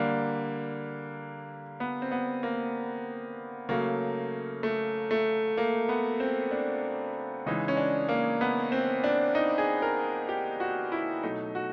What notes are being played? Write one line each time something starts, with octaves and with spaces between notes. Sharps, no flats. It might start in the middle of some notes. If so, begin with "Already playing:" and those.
Already playing: D3 G3 A#3
B3
C4
B3
A#3
C#3 F#3 A3 A#3
A3
A3
A#3
B3
C4
D4
C#3 E3 G#3 D#4
C#4
D4
A#3
B3
C4
D4
D#4
G#4
A#4
G4
F#4
E4
B2 F#3 A3 D#4
F#4